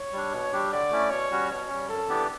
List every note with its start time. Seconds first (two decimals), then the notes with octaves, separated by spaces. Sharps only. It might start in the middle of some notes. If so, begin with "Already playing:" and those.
Already playing: C#5
0.13 G3 D4
0.32 B2
0.52 G3 D4 G4
0.72 D3 D5
0.90 A3 C#4 E4
1.10 B2 C#5
1.31 G3 C#4 F#4
1.50 B2 C#5
1.69 G3 C#4
1.88 F#2 A4
2.08 E3 B3 D4 G4